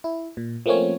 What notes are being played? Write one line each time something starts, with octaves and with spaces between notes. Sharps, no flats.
E4
A#2
F3 A3 A#3 C4 C#4 C#5